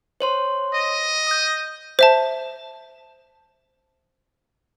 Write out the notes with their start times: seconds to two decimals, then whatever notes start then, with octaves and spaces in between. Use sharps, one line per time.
0.20 C5 C#5 C6
0.75 D#5
1.27 D#6 G6
1.99 C5 E5 A5